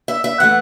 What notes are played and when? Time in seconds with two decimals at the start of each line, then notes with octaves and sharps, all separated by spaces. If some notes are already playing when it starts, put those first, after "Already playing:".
0.08 E5
0.24 E5
0.40 E3 A3 F#5